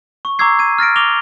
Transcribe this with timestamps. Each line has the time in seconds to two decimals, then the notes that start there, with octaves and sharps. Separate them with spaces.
0.25 C#6
0.39 A#5 C#6 D6 E6 G#6 C7
0.59 G#6 D#7
0.78 F6 A6 A#6 D7
0.96 D6 A#6 F7 G7